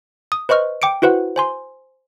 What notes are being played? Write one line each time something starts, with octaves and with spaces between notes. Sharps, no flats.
D#6
B4 C5 D#5 C#6 F6
G5 D6 C#7 D7
E4 F#4 B4 C5 F#5
C5 G#5 C6